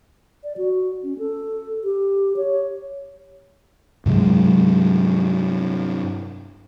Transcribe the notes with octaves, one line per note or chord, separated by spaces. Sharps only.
D5
F#4
C#4
A4
G4
C#5
G2 C3 F#3 G#3